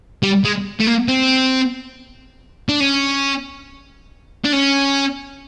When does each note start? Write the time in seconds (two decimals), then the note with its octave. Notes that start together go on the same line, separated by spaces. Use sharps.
0.23 G3
0.45 G#3
0.80 A3
0.87 A#3
1.08 C4
2.69 D4
2.80 C#4
4.45 D4
4.53 C#4